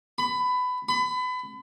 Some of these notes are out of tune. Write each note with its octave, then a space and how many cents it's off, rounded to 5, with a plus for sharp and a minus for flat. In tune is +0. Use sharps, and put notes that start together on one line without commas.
B5 +20
B5 +30